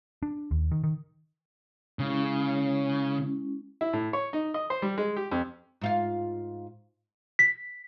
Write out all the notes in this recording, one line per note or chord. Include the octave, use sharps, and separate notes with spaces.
D4
D#2
D#3
D#3
C#3 G#3 C#4 E4
E4
A2
C#5
D#4
D#5
C5
G3
G#3
G4
F2
G#2 F4 F5
B6